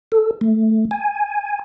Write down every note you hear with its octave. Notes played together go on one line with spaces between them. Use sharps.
A4
A3
G#5